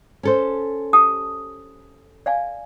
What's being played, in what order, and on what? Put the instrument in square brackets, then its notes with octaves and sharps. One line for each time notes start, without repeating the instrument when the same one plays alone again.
[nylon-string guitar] C#4 A4 C5
[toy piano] G4 A5 D#6
D5 F5 G#5